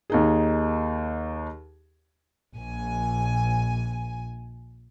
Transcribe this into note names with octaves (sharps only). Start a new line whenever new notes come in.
D#2 D#4 G#4
A#1 G#5